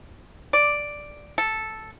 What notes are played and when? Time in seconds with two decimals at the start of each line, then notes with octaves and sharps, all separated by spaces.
0.53 D5
1.38 A4